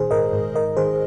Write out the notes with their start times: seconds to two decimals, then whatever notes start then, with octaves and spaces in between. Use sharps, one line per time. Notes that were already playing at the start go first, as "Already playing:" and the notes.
Already playing: A#2 D#3 G#4 C5
0.11 G#2 A#4 D#5
0.33 G#2
0.55 D#3 A#4 D#5
0.77 D#3 G#4 C5